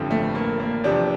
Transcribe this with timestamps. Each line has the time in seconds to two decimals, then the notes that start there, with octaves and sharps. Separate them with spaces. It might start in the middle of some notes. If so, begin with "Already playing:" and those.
Already playing: A1 G2 D3 F3 C4
0.11 A3
0.35 A#3
0.60 A#3
0.84 E2 C3 F3 D4